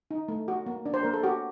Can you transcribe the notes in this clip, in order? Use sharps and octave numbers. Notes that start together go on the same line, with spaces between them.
D#4
A3
F#4
A#3
D4
C5
A#3 A#4
A4
F#4 G4